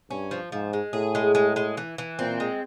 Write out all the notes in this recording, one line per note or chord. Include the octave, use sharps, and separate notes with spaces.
G2 C#4
F3
G#2 F3
G#3
A2 G#4
G#3
G#3
G#3
E3
E3
A#2 C4
G#3